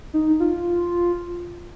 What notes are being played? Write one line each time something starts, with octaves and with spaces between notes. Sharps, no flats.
D#4
F4